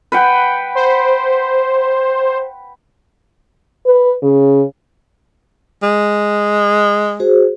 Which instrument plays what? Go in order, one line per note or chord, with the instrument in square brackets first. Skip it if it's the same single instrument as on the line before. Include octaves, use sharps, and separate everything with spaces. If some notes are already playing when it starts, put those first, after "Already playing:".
[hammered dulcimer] B4 F#5 G5
[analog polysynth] C5
[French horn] B4
C#3
[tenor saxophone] G#3
[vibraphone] F#4 G#4 C5